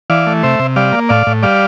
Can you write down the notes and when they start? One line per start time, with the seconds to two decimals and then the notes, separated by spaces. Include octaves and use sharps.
0.10 E3 D5 F5
0.27 A3
0.43 C3 C5 E5
0.59 C3
0.76 G3 D5 F5
0.92 A#3
1.09 A2 D5 F5
1.27 A2
1.42 G3 D5 F5